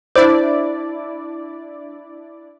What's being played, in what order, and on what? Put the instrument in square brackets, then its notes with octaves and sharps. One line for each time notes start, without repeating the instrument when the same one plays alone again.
[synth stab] D4 E4 D5 [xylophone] C5